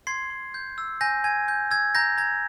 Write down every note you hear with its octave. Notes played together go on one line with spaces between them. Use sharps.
C6 G#6 C7
C6
G6
E6
G#5 G6 A#6
G#5 G#6
G6
E6 G#6
A#5 G6 A#6
A#5 G#6